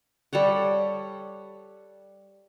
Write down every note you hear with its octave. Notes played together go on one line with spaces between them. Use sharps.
G3 A4 C#5 F#5